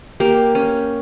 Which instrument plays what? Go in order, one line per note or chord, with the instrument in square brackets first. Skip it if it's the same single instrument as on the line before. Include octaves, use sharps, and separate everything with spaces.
[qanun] A#3 G4
C#4